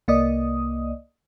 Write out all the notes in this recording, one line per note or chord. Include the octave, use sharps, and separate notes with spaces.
C2 A#3 D5 D#5 D#6